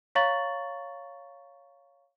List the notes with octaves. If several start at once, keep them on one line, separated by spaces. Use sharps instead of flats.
C#5 F5 A#5 C#6 A6 F#7